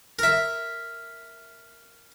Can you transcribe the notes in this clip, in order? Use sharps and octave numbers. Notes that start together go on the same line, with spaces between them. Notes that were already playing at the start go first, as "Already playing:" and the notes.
A#4 E5